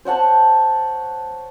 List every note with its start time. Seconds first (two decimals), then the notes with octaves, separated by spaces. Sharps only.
0.05 C5 C#5 F#5 A5